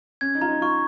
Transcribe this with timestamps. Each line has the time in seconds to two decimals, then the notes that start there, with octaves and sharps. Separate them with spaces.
0.21 C#4 G#6
0.35 D#4
0.41 F4 A#5
0.48 D#4
0.62 F4 C#6